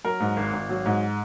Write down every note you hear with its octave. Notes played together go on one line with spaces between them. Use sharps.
F#3 A#4
G#2
G#1
G#1
F#3
G#2